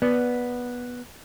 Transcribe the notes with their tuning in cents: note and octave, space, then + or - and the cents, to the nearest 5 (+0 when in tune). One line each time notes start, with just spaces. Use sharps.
B3 -10 D5 +0